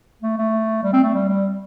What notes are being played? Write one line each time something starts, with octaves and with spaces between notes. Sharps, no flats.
A3
A3
G3
C4
A3
G3
G3